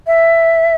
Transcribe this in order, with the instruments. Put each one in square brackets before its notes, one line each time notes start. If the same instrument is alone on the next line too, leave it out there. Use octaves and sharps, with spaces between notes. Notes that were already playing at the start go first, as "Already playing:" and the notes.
[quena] E5